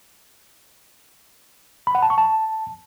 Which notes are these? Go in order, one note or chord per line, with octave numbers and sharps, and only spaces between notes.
B5
F#5
A5
C#6
A5